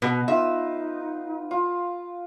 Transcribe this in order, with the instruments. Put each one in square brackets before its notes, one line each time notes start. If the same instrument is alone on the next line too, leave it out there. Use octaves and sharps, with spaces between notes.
[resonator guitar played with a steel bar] B2 [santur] B4 F#5
[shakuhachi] D#4 [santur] F4 [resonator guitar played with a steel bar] E5
[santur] F4